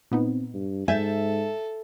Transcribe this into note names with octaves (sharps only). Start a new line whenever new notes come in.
A#2 B3 C4 D#4
G2
G#2 A4 E5 G#5 G6 A6